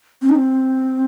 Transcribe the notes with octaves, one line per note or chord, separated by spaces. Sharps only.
C4
D#4
C4